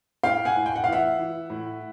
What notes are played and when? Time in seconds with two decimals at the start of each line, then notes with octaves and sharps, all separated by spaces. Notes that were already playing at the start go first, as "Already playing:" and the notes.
0.23 A2 F5 G5
0.45 F#5 G#5
0.56 A2
0.66 G5
0.76 F#5
0.84 F5
0.88 E3 E5 F#5
1.19 E3
1.50 A2